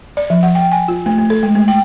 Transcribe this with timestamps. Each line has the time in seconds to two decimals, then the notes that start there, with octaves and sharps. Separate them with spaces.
0.17 D5
0.30 F3
0.43 F#5
0.55 G5
0.72 G#5
0.88 F4
1.06 A3
1.19 A3
1.30 A4
1.43 G#3
1.55 A3
1.68 G5